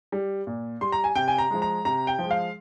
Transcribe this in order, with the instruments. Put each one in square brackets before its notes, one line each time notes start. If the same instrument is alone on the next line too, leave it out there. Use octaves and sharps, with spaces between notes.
[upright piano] G3
A#2
G3 C6
A#5
G#5
C3 G5
G#5
A#5
F3 G#3
A#5
C3 A#5
G5
F3
G#3
F5